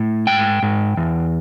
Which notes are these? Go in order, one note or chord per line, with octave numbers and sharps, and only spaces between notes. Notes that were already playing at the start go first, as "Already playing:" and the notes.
Already playing: A2
G#2 G5
G#2
E2